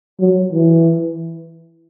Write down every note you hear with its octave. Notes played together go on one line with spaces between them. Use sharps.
F#3
E3